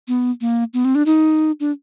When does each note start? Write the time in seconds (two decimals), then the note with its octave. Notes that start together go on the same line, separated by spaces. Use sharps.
0.08 B3
0.41 A#3
0.74 B3
0.85 C4
0.95 D4
1.06 D#4
1.60 D4